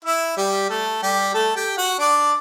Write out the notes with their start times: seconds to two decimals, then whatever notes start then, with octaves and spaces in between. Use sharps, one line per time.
0.05 E4 E5
0.37 G3 G4
0.69 A3 A4
1.03 G3 G4
1.34 A3 A4
1.56 G4 G5
1.77 F#4 F#5
1.99 D4 D5